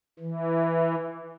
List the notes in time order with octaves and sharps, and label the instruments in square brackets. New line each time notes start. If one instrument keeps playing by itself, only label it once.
[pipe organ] E3